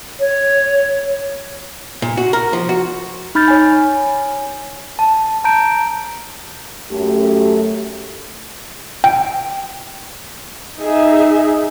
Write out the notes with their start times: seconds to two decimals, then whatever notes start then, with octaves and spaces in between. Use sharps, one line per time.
0.20 C#5
2.02 A#2
2.17 F#4
2.33 A#4
2.53 F3
2.69 F#4
3.35 D#4 B5 F6 G6 A6
3.48 C#5 G#5
4.99 A5
5.44 A5 A#5 G6 D7
6.92 F#2 A3 G4
9.04 G5
10.78 D#4 G#4 E5